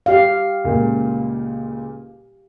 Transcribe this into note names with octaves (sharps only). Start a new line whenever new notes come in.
G4 F5
C#2 A#2